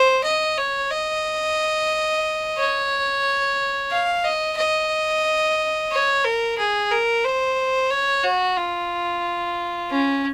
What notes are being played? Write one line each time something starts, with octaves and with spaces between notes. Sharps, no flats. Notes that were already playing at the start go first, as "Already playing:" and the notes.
Already playing: C5
D#5
C#5
D#5
C#5
F5
D#5
D#5
C#5
A#4
G#4
A#4
C5
C#5
F#4
F4
C#4